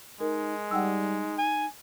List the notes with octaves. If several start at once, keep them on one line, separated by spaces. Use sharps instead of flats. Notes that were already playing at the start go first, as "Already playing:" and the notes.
G#3 D#4 A#4
G3 D#4 F#5 G5 E6
G#5